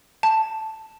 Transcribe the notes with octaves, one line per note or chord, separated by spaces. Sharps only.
A5